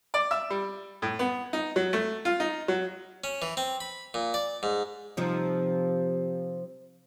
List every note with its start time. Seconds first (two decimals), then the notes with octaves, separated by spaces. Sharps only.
0.14 D5
0.31 E5
0.50 G3
1.02 A2
1.19 B3
1.53 D#4
1.76 F#3
1.93 A3
2.25 F4
2.40 D#4
2.68 F#3
3.24 C#4
3.42 E3
3.57 C4
3.80 B5
4.14 A#2
4.34 D5
4.63 G#2
5.17 C3 F3 D#4